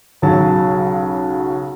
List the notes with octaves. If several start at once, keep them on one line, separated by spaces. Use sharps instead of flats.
B1 C#3 F#3 A5